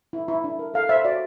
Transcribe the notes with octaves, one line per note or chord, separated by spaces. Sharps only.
E4
E4
D4
A#4
A4 F5
C5 E5
F#4 D5